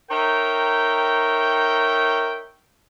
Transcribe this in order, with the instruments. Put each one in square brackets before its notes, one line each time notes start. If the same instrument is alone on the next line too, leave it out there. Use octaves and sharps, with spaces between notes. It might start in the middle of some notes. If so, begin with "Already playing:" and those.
[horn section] D#4 A#4 C#5 E5 G5